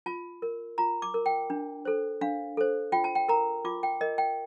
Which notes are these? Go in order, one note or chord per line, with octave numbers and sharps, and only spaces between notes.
F4 A5
A#4
F4 A#5
D6
A#4
G5
D4
A4 C5
D4 F5
A4 C5
F4 G5
A5
G5
A#4 A#5
F4 D6
G5
A#4 D#5
G5